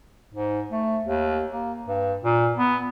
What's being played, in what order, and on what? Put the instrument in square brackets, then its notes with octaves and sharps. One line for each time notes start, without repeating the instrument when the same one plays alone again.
[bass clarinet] G#2
A3
D#2
A#3
G2
A#2
B3